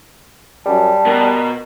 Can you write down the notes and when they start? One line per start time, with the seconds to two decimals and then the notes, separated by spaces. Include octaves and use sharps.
0.66 F#2 G3 A5
1.07 B2 A#4